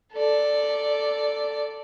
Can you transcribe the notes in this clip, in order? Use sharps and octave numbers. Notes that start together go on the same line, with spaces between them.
A4 D5